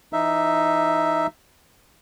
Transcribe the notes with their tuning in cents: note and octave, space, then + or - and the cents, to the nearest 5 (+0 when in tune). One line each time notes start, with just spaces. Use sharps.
E3 +25 D#4 +0 E5 +0